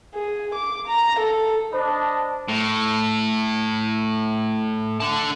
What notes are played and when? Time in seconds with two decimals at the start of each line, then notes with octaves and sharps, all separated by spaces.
0.14 G#4
0.55 D6
0.88 A#5
1.19 A4
1.73 D4 C5 D#5 A5 B5
2.48 A2
5.00 D3 A5